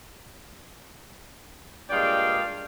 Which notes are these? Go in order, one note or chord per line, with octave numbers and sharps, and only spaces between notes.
G2 A#2 G#3 D5 F5 G5